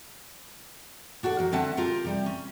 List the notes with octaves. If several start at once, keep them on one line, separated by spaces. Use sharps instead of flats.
D4 F#4 A4 F#5
D#3 F#3
D3 C4 D4 E5 F#5 A5
F4 G4 A#4
C3 G3
C#4